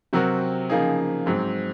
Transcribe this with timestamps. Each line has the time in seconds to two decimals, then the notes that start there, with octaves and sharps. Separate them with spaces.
0.13 C3 F#3 C4 F#4 A#4
0.69 C#3 F3 A#3 D#4 G#4
1.26 G#2 F#3 C4